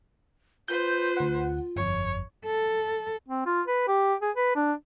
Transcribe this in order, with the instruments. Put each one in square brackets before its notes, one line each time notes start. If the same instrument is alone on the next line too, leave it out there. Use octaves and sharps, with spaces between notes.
[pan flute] F4 [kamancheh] B4 C5 [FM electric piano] G6
[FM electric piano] D2 F#5
[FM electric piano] G1 F2 [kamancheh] C#5
[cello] A4
[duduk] C4
F4
B4
G4
G#4
B4
D4